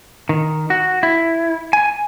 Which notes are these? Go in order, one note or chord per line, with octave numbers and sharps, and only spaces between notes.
D#3
F#4
E4
G#5